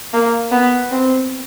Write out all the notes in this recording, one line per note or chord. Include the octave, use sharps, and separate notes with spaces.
A#3
B3
C4